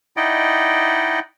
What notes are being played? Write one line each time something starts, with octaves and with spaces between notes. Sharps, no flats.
D#4 E4 D5 D#5 F#5 G5